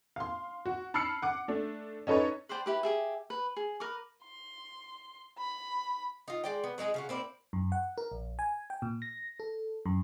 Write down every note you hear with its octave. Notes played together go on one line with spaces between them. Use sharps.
F5 C6
F#4
A5 B5 E6 F6 C7 C#7
F#5 D6
A3 D4
C#4 D#4 A4 B4 C#5
B4 C5 D5 G5
E4 G4 B4
G4 G#4 E5
B4
G#4
A#4 B4 D6
C6
B5
D#4 F4
G#3 D5 G5
B3
F#3 G#3 D#4 G#4
C#3 F4 F#4
A#3 C4 E4 D5
F#2
F#5
A#4
A#1
G#5
G5
A#2
A#6
A4
F#2